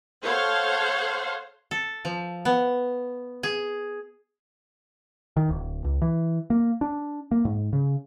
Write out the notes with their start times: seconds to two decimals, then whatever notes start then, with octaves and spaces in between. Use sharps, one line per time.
0.25 A4 C5 C#5 F5 F#5
1.71 A4
2.05 F3
2.45 B3
3.43 G#4
5.37 D#3
5.49 D1
5.84 C#2
6.02 E3
6.50 A#3
6.81 D4
7.31 A#3
7.45 G#2
7.73 C#3